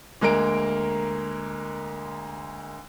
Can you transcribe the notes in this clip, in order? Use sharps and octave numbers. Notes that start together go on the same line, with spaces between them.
D2 G#3 A#3 A#4 D7